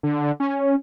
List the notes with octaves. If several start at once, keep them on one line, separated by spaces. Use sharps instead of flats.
D3
C#4